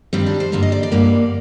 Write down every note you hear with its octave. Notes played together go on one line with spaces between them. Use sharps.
G2 D#3 G3 C4
D4
C5
G2 D3 G3 A#3 D5
D#5
D5
D5
G2 D3 G3 A#3